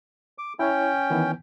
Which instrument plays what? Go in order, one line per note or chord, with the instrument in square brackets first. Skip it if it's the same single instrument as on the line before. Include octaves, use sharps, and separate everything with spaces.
[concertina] D6
[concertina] C#4 G5 [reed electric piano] E4 C#5
[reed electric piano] D#3 E3 B3